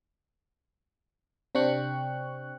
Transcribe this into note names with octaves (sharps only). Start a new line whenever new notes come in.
C3 C4 D4 G5 C#6 F#6